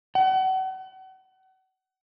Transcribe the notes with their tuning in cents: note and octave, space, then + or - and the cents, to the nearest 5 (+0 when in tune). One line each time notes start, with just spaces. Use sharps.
F#5 +35